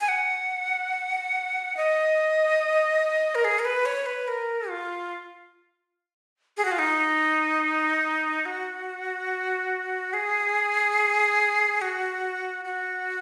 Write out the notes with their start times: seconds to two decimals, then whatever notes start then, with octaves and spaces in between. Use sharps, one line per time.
0.01 G#5
0.08 F#5
1.77 D#5
3.35 A#4
3.44 G#4
3.59 A#4
3.65 B4
3.86 C#5
4.06 B4
4.28 A#4
4.69 F4
6.57 G#4
6.65 F#4
6.71 F4
6.79 D#4
8.45 F#4
10.13 G#4
11.81 F#4
12.65 F#4